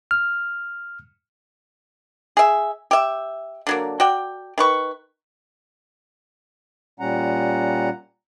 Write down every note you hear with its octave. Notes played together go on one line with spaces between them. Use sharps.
F6
G#4 E5
G4 E5
D3 F#3 A#3
F#4 D5 G5
D#3 B4 C#6
A#2 G3 C#4 F#5 A#5